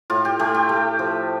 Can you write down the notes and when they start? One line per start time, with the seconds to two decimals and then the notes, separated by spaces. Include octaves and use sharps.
0.10 A2 F4
0.25 G4
0.40 A3 G4
0.55 G4
0.69 A3
0.99 F3